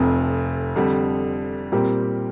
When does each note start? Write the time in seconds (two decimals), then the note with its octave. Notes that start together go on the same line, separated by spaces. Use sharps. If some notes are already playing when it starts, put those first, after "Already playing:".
Already playing: F1 F2 C3
0.76 F2 D3 G3
1.72 A#2 G3 C4 G4 A#4